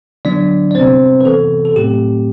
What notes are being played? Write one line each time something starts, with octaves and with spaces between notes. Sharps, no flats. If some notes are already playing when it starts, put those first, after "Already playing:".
D3 F#3 B3 D4 D5
D5
C3 G3 B3 C4 C5
B4
C3 E3 B3 A4
A4
A2 F#3 A3 C4 G4